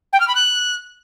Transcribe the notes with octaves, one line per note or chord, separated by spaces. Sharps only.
G5
F6
B5
F#6